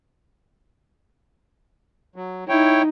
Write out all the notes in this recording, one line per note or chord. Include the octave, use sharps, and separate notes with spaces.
F#3
D#4 E4 C#5 G5